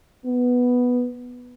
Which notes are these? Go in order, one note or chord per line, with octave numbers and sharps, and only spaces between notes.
B3